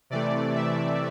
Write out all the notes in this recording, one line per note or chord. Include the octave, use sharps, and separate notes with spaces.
C3 E3 A3 D5
E5